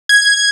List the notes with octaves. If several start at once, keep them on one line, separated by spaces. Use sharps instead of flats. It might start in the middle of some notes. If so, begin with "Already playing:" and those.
G#6